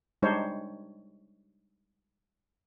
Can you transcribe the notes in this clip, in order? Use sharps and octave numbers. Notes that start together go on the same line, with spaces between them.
G3 G#3 D4 D#4 C5 C#5